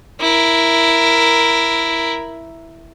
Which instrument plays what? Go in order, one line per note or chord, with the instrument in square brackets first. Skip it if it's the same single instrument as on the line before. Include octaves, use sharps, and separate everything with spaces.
[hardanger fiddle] E4 A#4